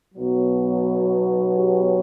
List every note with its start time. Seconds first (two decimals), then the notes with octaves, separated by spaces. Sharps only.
0.15 B1 B2 F#3
1.54 G4